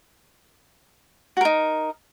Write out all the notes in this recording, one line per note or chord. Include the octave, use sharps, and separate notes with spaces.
D#4 F#4 A#4